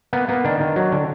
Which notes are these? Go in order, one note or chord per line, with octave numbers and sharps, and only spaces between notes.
A#3 B3
A#3 B3
D#3 D4
D#3
F#3
D3